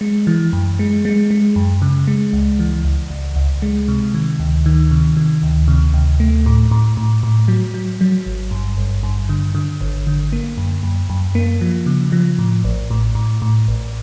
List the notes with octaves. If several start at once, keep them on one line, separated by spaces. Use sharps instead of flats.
G#3
E3
F#2
G#3
G#3
G#3
F#2
C#3
G#3
C#2
E3
C#2
C#2
C#2
G#3
C3
D#3
D2
D#3
C3
D#3
D2
C3
D2
A3
A2
A2
A2
A2
F#3
F#3
F#3
G#1
G2
G#1
G2
D3
D3
G#1
D3
A#3
F#2
F#2
F#2
A#3
F3
C#3
F3
A2
A1
A2
A2
A2
A1